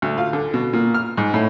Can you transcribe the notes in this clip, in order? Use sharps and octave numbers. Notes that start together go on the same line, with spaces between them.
D2
F4
D3
B2
A#2
F6
G#2
A2